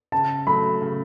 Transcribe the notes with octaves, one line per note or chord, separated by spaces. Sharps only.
C#3 A5
F#3 A3 B5
C#3